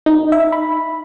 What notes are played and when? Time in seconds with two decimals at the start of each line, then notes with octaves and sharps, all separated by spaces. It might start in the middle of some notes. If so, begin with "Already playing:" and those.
0.06 D#4
0.32 E5
0.52 B5